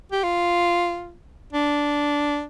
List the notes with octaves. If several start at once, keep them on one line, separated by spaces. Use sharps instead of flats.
G4
F4
D4